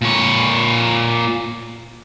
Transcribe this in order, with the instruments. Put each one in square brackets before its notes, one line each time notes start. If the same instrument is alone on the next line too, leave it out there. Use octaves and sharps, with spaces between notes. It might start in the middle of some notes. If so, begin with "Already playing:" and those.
[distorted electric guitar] A#2 C#5